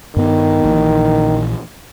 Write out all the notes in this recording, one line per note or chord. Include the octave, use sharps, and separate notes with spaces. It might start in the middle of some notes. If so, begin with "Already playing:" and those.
G2 D#3 B3
A#1 A#2 E3